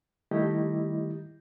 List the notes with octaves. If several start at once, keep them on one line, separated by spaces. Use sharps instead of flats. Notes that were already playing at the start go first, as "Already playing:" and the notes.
D#3 G3 A3 E4 G4 D#5